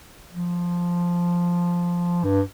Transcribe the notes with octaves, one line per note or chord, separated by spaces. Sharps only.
F3
G2